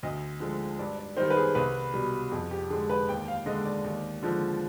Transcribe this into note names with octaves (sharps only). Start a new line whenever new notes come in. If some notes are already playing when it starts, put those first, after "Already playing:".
D2 D#5
D3 F3 G#3
G2 D5
D5
D#3 G3 C5
B4
G#4
C2 B4
B2 G3
F2 G#4
G4
D3 G#3 G#4
B4
D#2 G5
F5
D3 G#3 D#5
D5
D#2
D3 F3 G#3